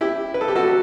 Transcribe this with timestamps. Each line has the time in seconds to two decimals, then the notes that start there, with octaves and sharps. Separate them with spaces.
0.01 E4 G4
0.34 B4
0.41 A4
0.48 G4
0.56 F#4 A4